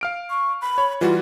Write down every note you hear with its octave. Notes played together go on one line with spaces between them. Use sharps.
F5 F6 D7
C#6
B5
C#5
E3 G3 F4 F#4